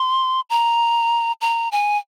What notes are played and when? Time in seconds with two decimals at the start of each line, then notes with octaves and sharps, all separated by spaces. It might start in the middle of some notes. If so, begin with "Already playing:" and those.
Already playing: C6
0.50 A#5
1.41 A#5
1.72 G#5